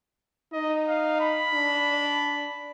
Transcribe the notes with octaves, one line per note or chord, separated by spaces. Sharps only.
D#4 D#5
F5
B5
D4